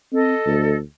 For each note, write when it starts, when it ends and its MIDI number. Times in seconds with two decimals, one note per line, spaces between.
0.13 0.34 60
0.13 0.78 69
0.13 0.78 75
0.46 0.81 38